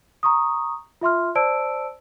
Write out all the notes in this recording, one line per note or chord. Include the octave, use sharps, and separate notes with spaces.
A#5 C#6 D#6
F4 E5 C6 F6
C5 D5 A5 E6 D7